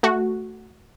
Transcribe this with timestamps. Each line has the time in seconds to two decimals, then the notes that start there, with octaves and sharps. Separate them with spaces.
0.03 A3 F#4